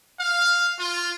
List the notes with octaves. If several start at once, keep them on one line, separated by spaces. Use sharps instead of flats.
F5
F4